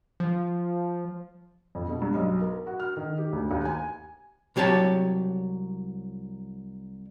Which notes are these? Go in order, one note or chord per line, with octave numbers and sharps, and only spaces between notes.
F3
F2
B2
G2
B1
A#4
F#4
F6
D#3
G4
D2
D#2
G#5
C2 F#3 G4 C#5 A5